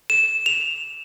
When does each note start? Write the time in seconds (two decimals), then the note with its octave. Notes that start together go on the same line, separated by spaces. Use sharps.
0.10 E7
0.46 F7